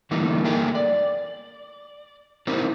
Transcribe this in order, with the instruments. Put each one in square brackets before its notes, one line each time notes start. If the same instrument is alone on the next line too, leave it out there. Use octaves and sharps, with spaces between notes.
[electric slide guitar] D3 E3 G3 A3 A#3 D#4
A3 A#3 G#4 A#4 G5
D5
C4 D#4 E4 G4 A#4 C5